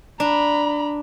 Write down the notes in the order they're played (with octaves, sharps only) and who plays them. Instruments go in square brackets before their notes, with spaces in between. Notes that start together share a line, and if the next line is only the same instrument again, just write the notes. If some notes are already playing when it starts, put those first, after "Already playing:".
[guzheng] D4 [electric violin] A#5 B5